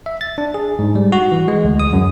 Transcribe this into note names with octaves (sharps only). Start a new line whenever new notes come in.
E5
A6
D4
G#4
G#2
G3
F#4
E3
G#3
D2
D#6
F#2